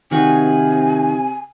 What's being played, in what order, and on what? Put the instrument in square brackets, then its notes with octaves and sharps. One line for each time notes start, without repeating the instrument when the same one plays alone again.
[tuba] C3 [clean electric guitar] D#3 F#4 [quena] G#5